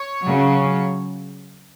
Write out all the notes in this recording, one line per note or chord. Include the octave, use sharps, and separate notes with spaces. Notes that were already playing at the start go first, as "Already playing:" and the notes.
Already playing: C#5
C#3 F#3